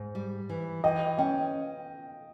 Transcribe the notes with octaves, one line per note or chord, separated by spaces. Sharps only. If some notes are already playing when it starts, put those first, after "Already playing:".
Already playing: G#2
G3
E3
E3 D#5 G5
C#4 D#5 G5